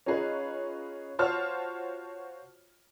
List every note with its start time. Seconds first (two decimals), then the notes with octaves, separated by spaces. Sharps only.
0.06 C#4 D#4 F4 G#4 B4 C#5
1.19 F4 F#4 C5 C#5 A5 F6